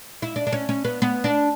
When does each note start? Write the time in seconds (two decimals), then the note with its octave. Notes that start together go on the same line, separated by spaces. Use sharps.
0.22 E4
0.36 D4
0.47 D4
0.52 C#4
0.69 C#4
0.85 B3
1.02 B3
1.24 D4